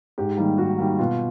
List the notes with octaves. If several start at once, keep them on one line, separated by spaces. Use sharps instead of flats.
G#2 G4
D#3 G3 A#3
G#2 F#4
D#3 G3 A#3
B2 F4